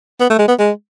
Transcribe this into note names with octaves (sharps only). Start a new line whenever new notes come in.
B3
A3
G#3
B3
G#3